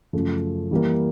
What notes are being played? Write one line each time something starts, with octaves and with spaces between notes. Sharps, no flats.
F#2 C#3 F3 A3
E3 G3 A#3